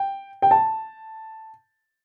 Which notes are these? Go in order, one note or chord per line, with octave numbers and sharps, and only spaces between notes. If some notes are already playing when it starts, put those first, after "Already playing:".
Already playing: G5
G5
A5